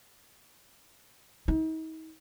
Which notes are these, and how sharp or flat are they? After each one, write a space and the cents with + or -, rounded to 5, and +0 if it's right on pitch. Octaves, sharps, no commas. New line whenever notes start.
D#4 +40